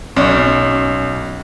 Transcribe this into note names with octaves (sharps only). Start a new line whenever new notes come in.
B1 C#4 D5